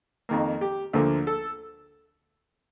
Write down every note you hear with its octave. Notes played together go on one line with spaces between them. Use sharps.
F2 D#3 A#3
G4
D2 D3 F3 A#3
A4